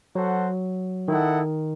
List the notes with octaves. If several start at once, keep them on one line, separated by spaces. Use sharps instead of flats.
F#3 F#4 A4 C5 F#5
D#3 E4 A4 D#5 F#5